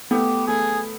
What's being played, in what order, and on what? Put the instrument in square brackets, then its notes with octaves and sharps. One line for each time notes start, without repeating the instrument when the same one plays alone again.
[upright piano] A3 B3 [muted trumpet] G4
[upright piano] A3 [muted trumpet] G#4